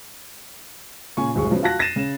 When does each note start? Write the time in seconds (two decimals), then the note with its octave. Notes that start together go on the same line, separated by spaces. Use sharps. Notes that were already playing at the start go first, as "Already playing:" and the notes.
1.17 A#2 C#3 G#5 C#6
1.35 D1 G1 G#3 G#4 C#6
1.50 C#3 F3 F#3 G#3 B3
1.63 F4 F#4 A5 F#6 A#6
1.79 A6 A#6 C7 D#7 E7
1.96 C#3 E7